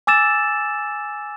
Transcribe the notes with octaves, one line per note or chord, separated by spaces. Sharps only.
G#5 D6 E6 A6 E7